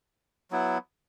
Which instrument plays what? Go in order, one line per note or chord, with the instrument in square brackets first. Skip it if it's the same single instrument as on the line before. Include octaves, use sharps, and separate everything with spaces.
[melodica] F#3 B3 E4